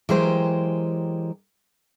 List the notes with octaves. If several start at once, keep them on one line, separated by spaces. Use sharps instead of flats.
E3 F#3 G#3 G4 A#4 C5